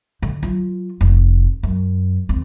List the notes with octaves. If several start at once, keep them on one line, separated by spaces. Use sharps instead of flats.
D3
F#3 F4
F1
F#2
D#2 C4